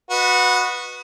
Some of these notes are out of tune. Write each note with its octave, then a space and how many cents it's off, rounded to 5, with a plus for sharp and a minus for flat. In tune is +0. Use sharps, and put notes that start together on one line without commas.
F#4 -20 B4 +0 D#5 -15